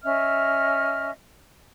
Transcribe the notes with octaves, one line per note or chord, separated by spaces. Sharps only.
C#4 D#5 E5 F6